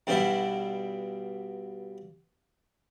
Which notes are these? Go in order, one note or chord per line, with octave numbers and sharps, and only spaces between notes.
G2 B2 D3 G3 B3 E4